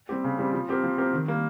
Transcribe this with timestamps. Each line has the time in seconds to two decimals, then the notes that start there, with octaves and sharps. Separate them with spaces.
0.09 G3 C4 G4
0.24 C#3
0.39 G3 C4 G4
0.53 F3
0.69 C4 G4 A#4
0.84 F3
0.98 C4 G4 A#4
1.13 D#3
1.28 G3 A#3